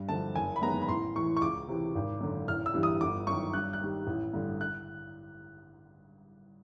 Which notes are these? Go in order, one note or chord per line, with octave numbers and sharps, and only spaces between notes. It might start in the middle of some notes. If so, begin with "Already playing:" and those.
Already playing: G2
D3 F3 A5
F#1 G#5
B5
F#2 D#3 G#3 B3 A#5
B5
A1 C6
A2 E3 C#6
C#6
C#2 D6
C3 E3
G#1
F#2 D3
A1 F6
E6
G2 E3 G3
D#6
G1 D6
F#2 D#3 C#6
G2 F#6
F#6
D#3 G3
A1
G2 D3
F#6